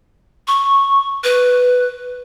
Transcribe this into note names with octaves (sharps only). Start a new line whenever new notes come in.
C#6
B4